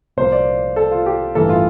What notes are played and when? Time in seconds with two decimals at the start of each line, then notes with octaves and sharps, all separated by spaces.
0.17 C2 A#2 F3 A#3 C5
0.32 D5
0.76 A4
0.91 F4
1.06 G4
1.35 A1 G2 E3 A#3 A4
1.49 F4